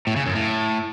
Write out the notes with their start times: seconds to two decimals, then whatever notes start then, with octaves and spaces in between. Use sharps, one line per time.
0.07 A2
0.16 C#3
0.26 F#2
0.35 A2